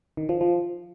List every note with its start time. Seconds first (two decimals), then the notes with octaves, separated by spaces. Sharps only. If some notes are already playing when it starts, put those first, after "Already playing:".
0.17 D#3
0.29 F3
0.41 F3